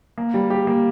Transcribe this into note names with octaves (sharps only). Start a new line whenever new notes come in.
A#3
G3
G4
A#3